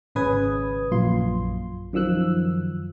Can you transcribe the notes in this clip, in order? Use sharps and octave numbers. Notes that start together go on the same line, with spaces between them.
G#1 C#3 C#4 B4 D#6 G#6
A#1 F#2 A#2 F4 C6
F#2 D#3 F3 E6 F#6